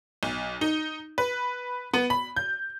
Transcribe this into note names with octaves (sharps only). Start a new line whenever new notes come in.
B1
D#4
B4
B3
B5
G6